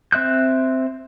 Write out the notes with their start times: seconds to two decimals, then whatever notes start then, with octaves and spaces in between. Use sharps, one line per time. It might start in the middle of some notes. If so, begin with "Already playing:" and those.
0.12 C4 E5 F#6 G6